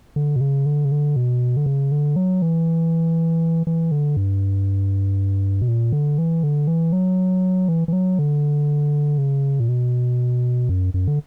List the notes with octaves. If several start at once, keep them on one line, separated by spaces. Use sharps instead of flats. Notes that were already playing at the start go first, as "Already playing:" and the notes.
D3
B2
C#3
D3
C#3
D3
B2
D3
C#3
D3
F#3
E3
E3
D3
G2
B2
A#2
D3
E3
D3
E3
F#3
E3
E3
F#3
D3
C#3
A#2
B2
F#2
F#2
D3